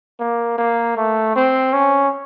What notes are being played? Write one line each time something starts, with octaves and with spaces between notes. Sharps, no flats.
A#3
A#3
A3
C4
C#4